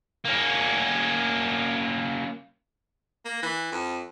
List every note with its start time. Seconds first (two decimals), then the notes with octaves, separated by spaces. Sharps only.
0.25 A#3 C#4
3.25 A#3
3.42 E3
3.72 F2